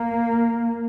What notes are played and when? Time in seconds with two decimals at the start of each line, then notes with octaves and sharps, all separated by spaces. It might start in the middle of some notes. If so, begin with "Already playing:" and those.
Already playing: A#3